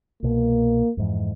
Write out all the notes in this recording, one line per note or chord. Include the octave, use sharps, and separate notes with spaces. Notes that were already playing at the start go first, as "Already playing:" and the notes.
C2 B2 A#3
F2 G#2 E3